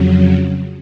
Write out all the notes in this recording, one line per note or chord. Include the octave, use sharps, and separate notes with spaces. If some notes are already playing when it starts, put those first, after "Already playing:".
Already playing: F2 C#3 F#3